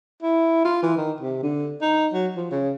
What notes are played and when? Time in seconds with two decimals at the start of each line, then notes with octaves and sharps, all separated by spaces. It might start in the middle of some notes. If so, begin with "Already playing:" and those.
0.22 E4
0.65 F4
0.83 E3
0.97 D#3
1.21 C3
1.43 D3
1.81 D#4
2.13 F#3
2.36 F3
2.51 C#3